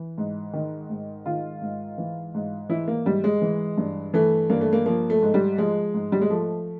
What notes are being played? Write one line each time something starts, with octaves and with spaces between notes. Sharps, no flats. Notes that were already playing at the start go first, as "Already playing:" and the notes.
Already playing: E3
G#2
D#3
G#2
D#3 F4
G#2
E3
G#2
E3 E4
A#3
G#2 G3
G#3
E3
G2
E3 A3
G2 A#3
A3
A#3
F3 A#3
A3
G#2
G3
F3 G#3
G#2
G3
G#3
F3 A3